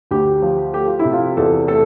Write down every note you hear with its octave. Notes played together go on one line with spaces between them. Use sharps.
D2 G4
F3
A3 G4
F4
E4
C3
F4
E2 A4
A3 A4